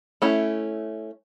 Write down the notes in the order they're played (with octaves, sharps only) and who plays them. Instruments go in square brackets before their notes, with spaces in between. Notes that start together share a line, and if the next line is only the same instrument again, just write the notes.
[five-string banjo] A3 C#4 E4